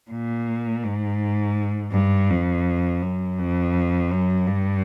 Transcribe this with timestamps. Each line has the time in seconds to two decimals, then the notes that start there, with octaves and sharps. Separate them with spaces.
0.11 A#2
0.84 G#2
1.92 G2
2.29 F2
3.02 F#2
3.38 F2
4.11 F#2
4.47 G2